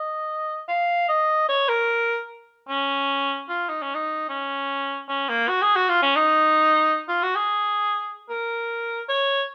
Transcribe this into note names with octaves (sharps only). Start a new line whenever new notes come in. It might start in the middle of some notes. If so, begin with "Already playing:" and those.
Already playing: D#5
F5
D#5
C#5
A#4
C#4
F4
D#4
C#4
D#4
C#4
C#4
A#3
F#4
G#4
F#4
F4
C#4
D#4
F4
F#4
G#4
A#4
C#5